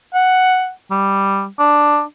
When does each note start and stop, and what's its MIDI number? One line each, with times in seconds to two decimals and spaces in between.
0.14 0.71 78
0.91 1.47 55
1.59 2.02 62